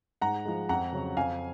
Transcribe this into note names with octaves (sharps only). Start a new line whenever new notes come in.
G#2 F#5 A#5
F3 G#3
F2 F#5 A#5
C#3 F#3
F2 F5 G#5